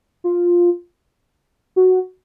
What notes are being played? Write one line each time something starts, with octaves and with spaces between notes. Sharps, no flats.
F4
F#4